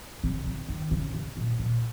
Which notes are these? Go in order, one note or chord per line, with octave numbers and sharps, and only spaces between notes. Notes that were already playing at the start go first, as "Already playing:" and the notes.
C3
C#3
D#3
C#3
C3
A#2
A#2